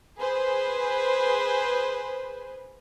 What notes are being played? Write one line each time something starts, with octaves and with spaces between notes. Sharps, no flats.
G#4 B4 C5